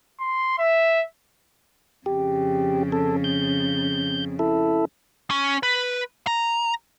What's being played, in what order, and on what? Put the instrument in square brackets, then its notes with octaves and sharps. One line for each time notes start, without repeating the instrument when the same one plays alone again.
[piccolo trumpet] C6
E5
[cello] F2 C#3 [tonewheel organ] G4
[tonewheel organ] A4
G6
E4 A4
[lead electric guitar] C#4
B4
A#5